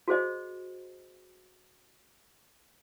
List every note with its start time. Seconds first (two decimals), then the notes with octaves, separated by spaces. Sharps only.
0.08 F#4 G#4 C5 D#5